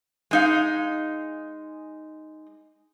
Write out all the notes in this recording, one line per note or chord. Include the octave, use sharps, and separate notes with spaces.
G#3 D#4 F5